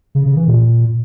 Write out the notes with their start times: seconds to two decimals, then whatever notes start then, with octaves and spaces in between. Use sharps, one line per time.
0.15 C#3
0.26 C#3
0.36 E3
0.47 A#2